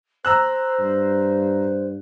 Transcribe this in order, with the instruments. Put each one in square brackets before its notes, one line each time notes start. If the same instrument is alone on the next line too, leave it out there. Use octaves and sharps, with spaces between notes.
[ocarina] C5 [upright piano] A#5 E6 F#6
[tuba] G2